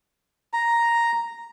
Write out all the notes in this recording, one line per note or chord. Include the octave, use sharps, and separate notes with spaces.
A#5